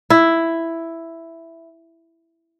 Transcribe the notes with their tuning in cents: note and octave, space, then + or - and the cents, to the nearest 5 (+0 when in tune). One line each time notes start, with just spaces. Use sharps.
E4 +5